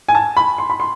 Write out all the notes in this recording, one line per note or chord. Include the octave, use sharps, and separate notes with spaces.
G#5
A5
B5
C6
B5
C6